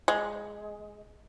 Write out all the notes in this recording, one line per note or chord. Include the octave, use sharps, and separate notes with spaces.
G#3